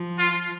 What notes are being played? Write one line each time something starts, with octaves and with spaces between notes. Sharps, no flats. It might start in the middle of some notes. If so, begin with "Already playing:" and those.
Already playing: F3
F4